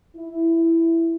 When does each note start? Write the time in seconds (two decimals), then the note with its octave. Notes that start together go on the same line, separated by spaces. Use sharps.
0.16 E4